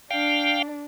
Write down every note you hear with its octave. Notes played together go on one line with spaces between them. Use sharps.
D4 F5 G5